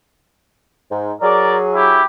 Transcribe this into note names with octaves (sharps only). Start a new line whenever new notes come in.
G#2
F#3 G#4 A#4 D5
E4 G4